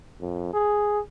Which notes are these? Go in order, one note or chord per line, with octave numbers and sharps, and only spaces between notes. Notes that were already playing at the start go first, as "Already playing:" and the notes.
F2
G#4